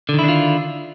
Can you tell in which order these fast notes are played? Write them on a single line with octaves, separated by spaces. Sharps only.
D3 D#3 E4 D4 F4